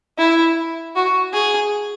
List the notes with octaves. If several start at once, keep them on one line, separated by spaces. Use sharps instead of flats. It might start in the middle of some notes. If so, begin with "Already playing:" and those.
E4
F#4
G#4